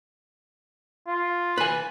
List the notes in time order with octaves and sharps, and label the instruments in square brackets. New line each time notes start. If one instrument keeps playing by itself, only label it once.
[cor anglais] F4
[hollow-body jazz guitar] B4 G#5